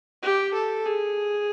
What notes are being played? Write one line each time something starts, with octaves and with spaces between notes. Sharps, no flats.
G4
A4
G#4